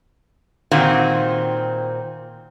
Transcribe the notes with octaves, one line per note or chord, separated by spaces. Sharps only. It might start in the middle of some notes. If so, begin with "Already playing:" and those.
A#2 D#3 C4 F#4